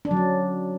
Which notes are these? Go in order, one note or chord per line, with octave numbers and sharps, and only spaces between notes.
D4
F#3
C#4